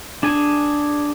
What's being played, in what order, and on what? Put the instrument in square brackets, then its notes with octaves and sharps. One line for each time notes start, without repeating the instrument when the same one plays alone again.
[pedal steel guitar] D4 G#4 G#5